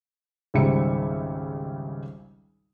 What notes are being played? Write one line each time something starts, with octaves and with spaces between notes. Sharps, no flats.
G#1 C#2 C#3 G3 E5 C#7